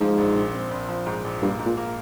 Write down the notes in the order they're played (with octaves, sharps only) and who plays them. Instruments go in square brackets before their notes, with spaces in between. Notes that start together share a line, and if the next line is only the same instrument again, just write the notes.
[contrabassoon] G#2 [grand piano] F3
[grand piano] A#1
A#1
C4
A#1
F3
G#2
A#1
[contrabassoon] G2 [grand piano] A#3
[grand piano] G#2
[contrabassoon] A#2
[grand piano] A#3